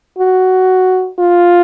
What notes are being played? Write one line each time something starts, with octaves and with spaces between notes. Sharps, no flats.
F#4
F4